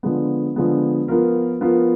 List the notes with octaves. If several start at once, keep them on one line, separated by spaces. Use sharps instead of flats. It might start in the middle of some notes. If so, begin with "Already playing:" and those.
D3 F3 G#3 B3
D3 F3 G#3 B3
F3 B3 F4 A#4
F3 B3 F4 A#4